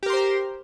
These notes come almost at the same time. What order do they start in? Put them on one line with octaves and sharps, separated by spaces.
G4 A#4 C6 C5 A#5